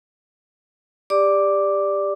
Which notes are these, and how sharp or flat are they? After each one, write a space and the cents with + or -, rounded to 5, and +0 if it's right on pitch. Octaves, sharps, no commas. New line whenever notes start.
G4 +25 D5 +0 D6 +0